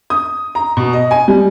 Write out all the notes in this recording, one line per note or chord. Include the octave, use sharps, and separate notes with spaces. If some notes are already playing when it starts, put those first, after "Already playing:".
D#6
A#5
B2
D#5
G#5
G3